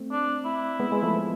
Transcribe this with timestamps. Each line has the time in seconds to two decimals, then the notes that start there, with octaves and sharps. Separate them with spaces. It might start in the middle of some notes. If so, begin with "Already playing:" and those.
Already playing: A3 C4
0.11 D4
0.45 E4
0.80 G#3 B3
0.92 G#3
1.03 F3 A3